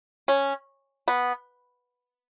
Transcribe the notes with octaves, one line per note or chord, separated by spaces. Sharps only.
C#4
B3